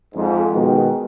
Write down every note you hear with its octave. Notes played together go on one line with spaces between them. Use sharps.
F2 G#2
B2 D#3 G#3